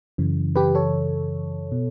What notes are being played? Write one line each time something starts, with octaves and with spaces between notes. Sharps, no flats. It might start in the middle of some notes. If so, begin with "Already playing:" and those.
F#2 C#3 E3
G4 B4
A4 C#5
B2